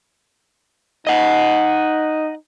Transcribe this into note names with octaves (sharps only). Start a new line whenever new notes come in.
D#4 D#5 F#5